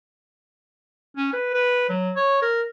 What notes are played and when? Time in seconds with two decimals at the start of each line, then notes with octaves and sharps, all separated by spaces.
1.17 C#4
1.33 B4
1.54 B4
1.89 F#3
2.16 C#5
2.42 A#4